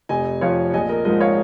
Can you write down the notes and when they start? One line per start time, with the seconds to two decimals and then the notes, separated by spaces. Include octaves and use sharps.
0.09 F1 D#5 G#5
0.41 F2 F3 C#5 F5
0.73 A#1 D#5 G#5
0.89 A#4 D#5
1.05 G#2 F3 A#4 D#5
1.20 C#5 F5